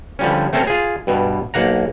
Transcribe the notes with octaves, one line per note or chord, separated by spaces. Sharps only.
D3 F3 G3 C#4
A3 C4 C#4 A4 A#4
F4 G#4
G2 B2
B1 A#3 F#5 A#5